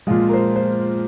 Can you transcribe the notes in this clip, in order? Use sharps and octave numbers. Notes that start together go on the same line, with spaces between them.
A#2 F3 G#3 F4
A#4
C5
C5